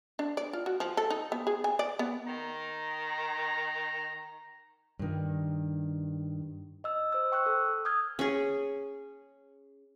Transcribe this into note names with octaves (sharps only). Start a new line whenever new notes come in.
D4
D5
F4
F#4
F3
A4
D#4
B3
G#4
G#5
D5
B3
D#3 A#5
G2 D#3
D#5 E6
C5 E6
G5 C#6 E6 F#6
A4
D#6 F6 G6 G#6
C#4 G#4